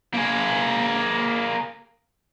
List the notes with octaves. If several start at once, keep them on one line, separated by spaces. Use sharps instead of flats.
A#3 G#4